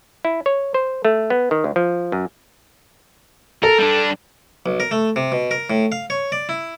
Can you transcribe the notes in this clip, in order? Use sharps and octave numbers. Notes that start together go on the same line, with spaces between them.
E4
C#5
C5
A3
B3
D#3
D2
F3
F#2
A4 A#4
G3 D4
B1
A#4
A3
C3
B2
A#4
A2
F5
C#5
D5
E4